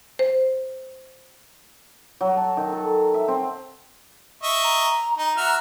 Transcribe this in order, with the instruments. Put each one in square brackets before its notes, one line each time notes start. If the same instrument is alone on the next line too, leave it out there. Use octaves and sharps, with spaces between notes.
[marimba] C5
[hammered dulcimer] F#3
A5
D#3
A4
E5
C4
[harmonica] D#5 E5 C#6
[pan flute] A#5
[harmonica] D#4 [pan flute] A#5
[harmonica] F#4 E5 F6